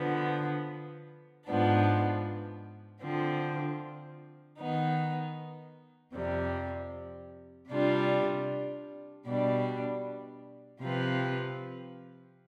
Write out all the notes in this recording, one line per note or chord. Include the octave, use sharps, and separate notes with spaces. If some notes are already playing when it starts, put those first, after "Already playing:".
Already playing: D3 F3 B3
G#2 F3 B3 D4
D3 F3 C4
D#3 B3 D#4
F2 C3 G3
C3 G3 D4 F4
B2 G3 D4
C3 F3 C4 F4 B4